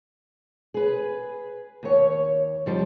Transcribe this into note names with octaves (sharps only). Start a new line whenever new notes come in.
G#4 B4
D#2 C#5
F2 F3 G3